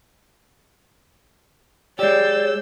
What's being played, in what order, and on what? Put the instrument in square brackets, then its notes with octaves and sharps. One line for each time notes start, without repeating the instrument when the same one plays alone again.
[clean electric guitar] G#3 G4 [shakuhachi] C#5 [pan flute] D5 [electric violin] E6 G6